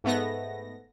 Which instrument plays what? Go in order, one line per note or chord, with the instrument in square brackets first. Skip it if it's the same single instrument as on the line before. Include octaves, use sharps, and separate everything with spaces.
[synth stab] G#2 A3 B3 A#6